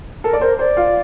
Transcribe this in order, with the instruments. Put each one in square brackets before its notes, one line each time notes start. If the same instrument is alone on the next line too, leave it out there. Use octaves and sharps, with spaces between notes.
[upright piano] A4 [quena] A#4
[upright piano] D5
[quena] A#4 [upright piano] C5
[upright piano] C5 [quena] D5
[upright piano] F4